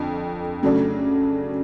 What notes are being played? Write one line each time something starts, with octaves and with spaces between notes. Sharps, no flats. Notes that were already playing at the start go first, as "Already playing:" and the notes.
Already playing: F2 D3
C#3 F#3 A3 D4